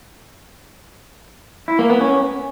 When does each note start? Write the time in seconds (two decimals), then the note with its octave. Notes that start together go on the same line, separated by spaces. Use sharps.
1.68 E4
1.79 A#3
1.90 B3
2.01 C#4